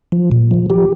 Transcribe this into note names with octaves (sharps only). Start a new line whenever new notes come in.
F3
A#2
F3
F3 G4